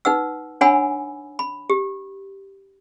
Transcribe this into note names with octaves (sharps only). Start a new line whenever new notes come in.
D#4 B4 F#5 E6
D4 C#5 F#5 G#5 B5 E6
B5
G4